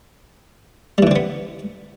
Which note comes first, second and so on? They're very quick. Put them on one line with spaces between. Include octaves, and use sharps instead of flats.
G3 E3 D3 C4 B3